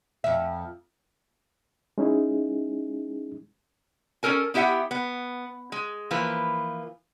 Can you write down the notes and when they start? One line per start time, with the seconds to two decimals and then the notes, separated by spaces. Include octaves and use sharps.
0.24 F2 E5
1.98 G#3 C#4 D#4 E4 G#4
4.23 C#4 D#4 A4 A#4 G#5
4.54 B3 E4 G4 E5 F#5
4.91 B3
5.72 G#3
6.11 E3 F3 A#3 B4